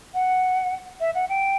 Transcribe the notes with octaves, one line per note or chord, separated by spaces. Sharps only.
F#5
E5
F#5
G5